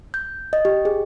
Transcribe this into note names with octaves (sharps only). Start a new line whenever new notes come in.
G6
D#5
G4
G#4